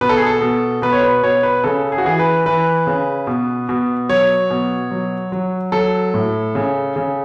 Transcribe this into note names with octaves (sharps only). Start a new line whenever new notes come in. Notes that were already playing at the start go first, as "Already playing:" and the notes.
B2 B4
A4
G#4
A4
B2
B2 B4
C#5
B4
B2 C#5
B4
C#3 A4
G#4
F#4
E3 G#4
B4
E3 B4
C#3
B2
B2
F#3 C#5
B2
F#3
F#3
F#3 A4
A2
C#3
C#3